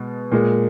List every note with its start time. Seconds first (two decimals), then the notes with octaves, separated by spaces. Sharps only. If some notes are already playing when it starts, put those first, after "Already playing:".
Already playing: B2 G#3
0.32 A#2 G#3